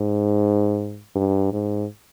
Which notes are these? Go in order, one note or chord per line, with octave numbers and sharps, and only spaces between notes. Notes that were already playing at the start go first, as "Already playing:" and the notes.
Already playing: G#2
G2
G#2